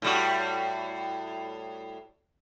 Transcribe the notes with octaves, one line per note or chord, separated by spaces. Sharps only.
A2 G3 F#4